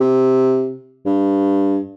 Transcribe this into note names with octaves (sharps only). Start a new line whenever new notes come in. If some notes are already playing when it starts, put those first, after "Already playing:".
C3
G2